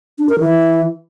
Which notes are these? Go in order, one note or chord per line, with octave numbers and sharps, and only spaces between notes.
D4
A#4
E3